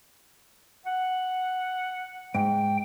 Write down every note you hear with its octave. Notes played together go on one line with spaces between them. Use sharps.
F#5
G#2 G5